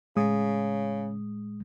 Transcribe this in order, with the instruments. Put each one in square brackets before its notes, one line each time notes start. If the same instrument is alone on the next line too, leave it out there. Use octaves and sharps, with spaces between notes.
[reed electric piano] A2 G#3 D#6 [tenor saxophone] C#3